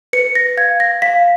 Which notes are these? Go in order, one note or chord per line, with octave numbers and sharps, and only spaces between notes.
B4 C#7
A#6
F5 G#6
A#6
F5 B6